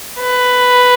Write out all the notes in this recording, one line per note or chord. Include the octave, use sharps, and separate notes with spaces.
B4